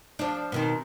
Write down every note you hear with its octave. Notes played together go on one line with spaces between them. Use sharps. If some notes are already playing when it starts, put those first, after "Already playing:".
F3 D4
B2 D#3 C4